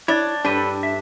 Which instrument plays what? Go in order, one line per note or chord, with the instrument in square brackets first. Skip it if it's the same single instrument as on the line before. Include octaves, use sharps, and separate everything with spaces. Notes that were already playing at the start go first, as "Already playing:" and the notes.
[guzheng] D4 [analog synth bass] E4 [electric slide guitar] C#5 D5
[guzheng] G2 [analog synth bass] D4 [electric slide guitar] A4 B4 C5
[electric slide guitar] E5